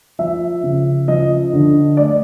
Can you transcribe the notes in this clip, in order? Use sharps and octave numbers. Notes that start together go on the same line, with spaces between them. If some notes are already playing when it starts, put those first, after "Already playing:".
F3 E5
C#3
F3 D#5
D3
A3 D5